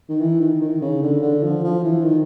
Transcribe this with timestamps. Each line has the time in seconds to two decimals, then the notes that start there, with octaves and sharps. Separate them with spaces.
0.09 D#3
0.21 E3
0.41 D#3
0.61 D#3
0.81 C#3
1.02 D3
1.22 D3
1.43 F3
1.63 F3
1.83 E3
2.04 D#3